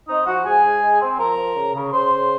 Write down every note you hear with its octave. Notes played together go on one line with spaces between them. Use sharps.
C4 D#4 D#5
F3 F#4 F#5
G#2 G#4 G#5
G#2
G#3
C4
F3 A#4 A#5
F3
C#3
C#3
C#3 C5 C6
C#3